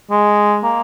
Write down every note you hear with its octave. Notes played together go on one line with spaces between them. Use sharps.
G#3
A#3